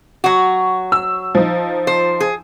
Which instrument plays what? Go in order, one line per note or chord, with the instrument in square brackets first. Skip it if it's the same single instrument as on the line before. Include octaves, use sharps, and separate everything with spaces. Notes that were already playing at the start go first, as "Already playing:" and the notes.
[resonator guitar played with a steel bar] F#3 F#4
[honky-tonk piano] E6
F3 D#4
[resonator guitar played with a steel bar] C5
G#4